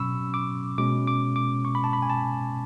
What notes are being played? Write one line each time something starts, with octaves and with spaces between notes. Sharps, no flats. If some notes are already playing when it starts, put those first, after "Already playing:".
Already playing: B2 F#3 C#4 B5 C#6 E6
D6
B2 G#3 C#4 D6
D6
D6
C#6
B5
A5
B5
G#5
A5